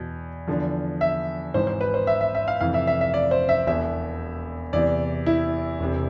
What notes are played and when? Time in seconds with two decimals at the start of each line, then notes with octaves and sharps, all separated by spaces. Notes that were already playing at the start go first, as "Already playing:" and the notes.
Already playing: E2 B2
0.47 E2 D3 F3
1.01 E5
1.54 G#1 G#2 E3 C5
1.67 C5
1.81 B4
1.94 C5
2.07 E5
2.21 E5
2.35 E5
2.48 F5
2.60 F1 F2 E3 F5
2.74 E5
2.87 E5
3.01 E5
3.14 D5
3.31 C5
3.49 E5
3.66 E1 E2 B2 E5
4.73 E2 C3 E3 D5
5.26 E4
5.80 E1 E2 C3